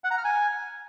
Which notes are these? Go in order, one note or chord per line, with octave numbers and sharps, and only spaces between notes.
F#5
A#5
F6
G#5